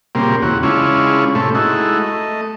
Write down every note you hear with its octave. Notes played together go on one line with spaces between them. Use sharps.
A#2 C#3 G3 A#3 C4
E2 C#3 F#4
C#3 G#3 C#4 D4 E4 F4
A2 C3 A3 C#4
G#3 D#4 E4 F#4 A4
A3 D#5